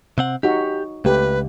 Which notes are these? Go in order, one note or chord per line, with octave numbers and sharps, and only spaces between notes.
C3 C4 F#5
D#4 F#4 G4
C#2 A3 G4 B4